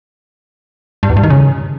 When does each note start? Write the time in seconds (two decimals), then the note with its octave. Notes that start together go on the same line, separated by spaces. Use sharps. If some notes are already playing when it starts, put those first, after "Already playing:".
1.03 G2
1.10 E2
1.17 G2
1.23 D#3
1.30 C#3